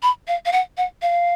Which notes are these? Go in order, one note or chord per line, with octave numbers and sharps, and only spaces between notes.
B5
F5
F5
F#5
F#5
F5